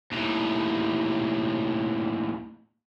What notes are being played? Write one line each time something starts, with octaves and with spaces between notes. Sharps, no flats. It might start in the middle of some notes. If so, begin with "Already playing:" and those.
D#2 A2